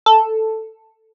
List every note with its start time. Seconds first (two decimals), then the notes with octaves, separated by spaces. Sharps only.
0.06 A4